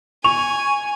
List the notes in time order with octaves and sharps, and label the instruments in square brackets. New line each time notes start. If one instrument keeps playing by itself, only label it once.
[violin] G#5 [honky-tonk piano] C#6 F7